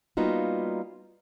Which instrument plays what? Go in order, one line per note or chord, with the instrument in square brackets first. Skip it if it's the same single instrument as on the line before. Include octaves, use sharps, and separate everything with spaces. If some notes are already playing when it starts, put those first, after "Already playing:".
[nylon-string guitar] G3 A#3 B3 D#4 F4 F#4